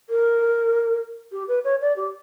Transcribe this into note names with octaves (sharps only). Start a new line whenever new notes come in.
A#4
G4
B4
C#5
D5
G4